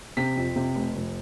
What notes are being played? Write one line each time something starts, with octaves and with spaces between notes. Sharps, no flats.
C3 B6
F2
C3
F1
F1